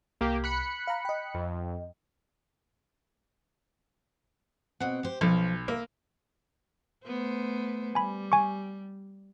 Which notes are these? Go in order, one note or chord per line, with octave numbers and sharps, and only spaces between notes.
C2 A#3 G4
B5 F#6 C#7
F5 A#5
D#5 G5
F2
B2 C4 F#5
G4 C5
B1 F3
A#3 E5
A3 B3 C5
G3 G#5 B5
G#5 C#6